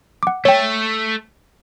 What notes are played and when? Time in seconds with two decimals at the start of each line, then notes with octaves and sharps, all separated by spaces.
0.23 F#5 D6
0.45 A3 C#5 G5